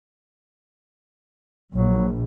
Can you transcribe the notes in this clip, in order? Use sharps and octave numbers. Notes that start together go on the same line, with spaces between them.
A#1 F#3